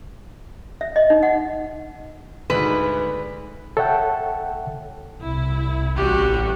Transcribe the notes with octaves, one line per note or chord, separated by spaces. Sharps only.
E5
D#5
D#4
F#5
D2 G#2 B4
A4 C#5 E5 F#5 G5 A5
C2 E4
A1 G3 F#4 G4